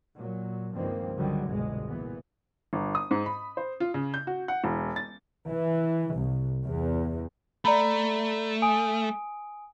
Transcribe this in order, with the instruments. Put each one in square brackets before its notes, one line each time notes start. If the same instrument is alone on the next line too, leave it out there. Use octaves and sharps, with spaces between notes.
[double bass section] A#2 F#3
C#2 G2 D#3 F3 A#3 C4
C#2 D3 D#3 F#3 G3
G1 C2 B2 G#3
A#2 E3 B3
[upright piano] G1
D#6
G#2
B5
C5
F4
C#3
G6
F#4
F#5
E1
A6
[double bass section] E3
C2
E2
[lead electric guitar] A3 [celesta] D5 A#5 B5
[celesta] G#5 D#6 D7